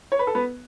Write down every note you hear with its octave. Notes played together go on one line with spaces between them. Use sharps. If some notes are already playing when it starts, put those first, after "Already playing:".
C#5
B4
A4
B3 B4